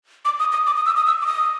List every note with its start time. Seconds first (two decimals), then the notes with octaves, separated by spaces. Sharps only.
0.25 D6
0.39 D#6
0.52 D#6
0.67 D6
0.76 D#6
0.86 E6
0.97 D#6
1.07 E6
1.22 D6
1.26 D#6